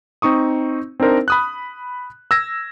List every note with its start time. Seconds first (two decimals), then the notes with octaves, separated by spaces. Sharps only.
0.22 C4 D#4 C#6 D#6
1.00 C4 D4 D#4 A#4 C5
1.28 B5 D#6 F#6
2.31 E6 G#6 A#6